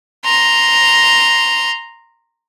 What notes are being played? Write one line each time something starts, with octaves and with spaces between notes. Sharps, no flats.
A#5 C6